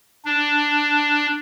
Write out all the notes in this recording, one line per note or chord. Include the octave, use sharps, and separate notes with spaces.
D4